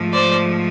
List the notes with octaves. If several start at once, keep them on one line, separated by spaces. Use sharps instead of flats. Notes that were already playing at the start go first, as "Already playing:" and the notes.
Already playing: G#2 F3 A3
C5 D5